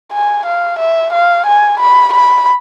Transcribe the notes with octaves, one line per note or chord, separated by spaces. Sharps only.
G#5
F5
E5
F5
G#5
B5
B5